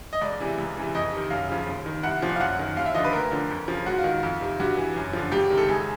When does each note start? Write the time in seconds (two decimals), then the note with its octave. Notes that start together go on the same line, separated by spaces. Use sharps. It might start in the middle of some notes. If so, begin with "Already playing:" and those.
0.13 D#5
0.21 C#2 D5
0.40 C3 E3
0.58 C#2
0.77 C3 E3
0.95 F2 D#5
1.13 C3 D#3
1.30 F#2 F5
1.49 C#3 F3
1.67 D#2
1.86 D#3
2.03 C2 F#5
2.22 A#2 F3
2.36 F5
2.40 F#2 F#5
2.59 D#3
2.76 D#2 F5
2.86 E5
2.95 D3 F3 D#5
3.04 B4
3.13 D2 A#4
3.32 D3 F3
3.50 F2
3.68 C#3 F3
3.86 G#2 F#4
3.98 F4
4.04 D#3
4.23 F2 F4
4.41 C3 D#3
4.60 G2 F#4
4.77 E3
4.96 F#2
5.13 D3 F3
5.32 C#2 G4
5.50 C3 D#3
5.57 A4
5.68 C#2 G#4